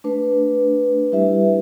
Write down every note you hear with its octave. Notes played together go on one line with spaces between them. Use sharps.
A3 D4 B4
G3 E4 G4 B4 E5